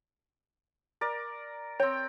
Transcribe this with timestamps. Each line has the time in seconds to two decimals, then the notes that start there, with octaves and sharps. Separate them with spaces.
1.01 A#4 D5
1.80 C4 C#5 G5